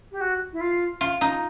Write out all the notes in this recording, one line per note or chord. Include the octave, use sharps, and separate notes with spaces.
G4
F#4
E4
F4
F4
D#4